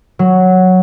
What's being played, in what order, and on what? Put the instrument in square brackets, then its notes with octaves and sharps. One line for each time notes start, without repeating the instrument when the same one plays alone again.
[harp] F#3